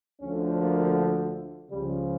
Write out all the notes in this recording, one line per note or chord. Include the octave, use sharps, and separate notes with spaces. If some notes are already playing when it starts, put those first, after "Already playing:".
D2 D3 F3 C#4
A#3
C#2 C#3 F3 G3